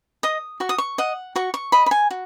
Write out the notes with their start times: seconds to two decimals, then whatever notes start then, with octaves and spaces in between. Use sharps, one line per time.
0.23 D#5 D#6
0.60 F#4 C#6
0.69 D#6
0.78 C#6
0.98 D#5 F#5
1.36 F#4 C#6
1.54 C#6
1.72 D#5 B5
1.86 B5
1.91 G#5
2.11 F#4